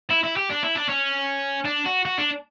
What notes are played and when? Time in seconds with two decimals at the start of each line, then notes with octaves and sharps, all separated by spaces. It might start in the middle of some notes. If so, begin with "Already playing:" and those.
0.10 E4
0.24 E4
0.36 G4
0.50 D4
0.63 E4
0.75 D4
0.89 C#4
1.66 D4
1.86 F#4
2.05 F#4
2.18 D4